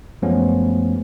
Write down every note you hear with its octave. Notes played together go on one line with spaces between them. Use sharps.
F#2 F3 G#3 A3 B3 C#4